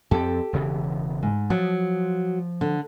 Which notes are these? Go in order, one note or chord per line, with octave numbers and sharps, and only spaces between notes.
F2 C4 G4 A4
E1 C#3 E3
G#2
F3 F#3
D3